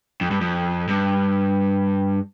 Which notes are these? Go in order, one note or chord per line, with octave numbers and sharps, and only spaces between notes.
F2
G2
F2
G2